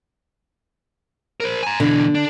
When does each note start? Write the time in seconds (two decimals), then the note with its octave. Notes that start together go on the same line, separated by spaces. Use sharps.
1.40 A#4 C5
1.63 G#5 A#5
1.80 B2 D3 E3
2.15 D4